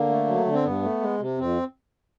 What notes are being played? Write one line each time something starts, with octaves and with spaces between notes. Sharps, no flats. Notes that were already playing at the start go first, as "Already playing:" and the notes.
Already playing: D3 A#3
A3
F#3
D3
C4
G2 B3
A3
G#3
C3
F2 C4